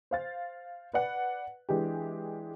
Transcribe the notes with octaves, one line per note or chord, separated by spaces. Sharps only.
C5 F5 A6
B4 D5 F#5
E3 G#3 D4 G4